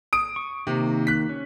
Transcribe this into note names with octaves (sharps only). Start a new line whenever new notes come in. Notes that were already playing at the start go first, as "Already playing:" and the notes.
D#6 D7
C#6
C3 D#3 A#3
F#6 B6
C#4